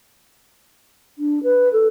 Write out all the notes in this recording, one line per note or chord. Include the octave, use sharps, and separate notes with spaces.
D4
B4
A4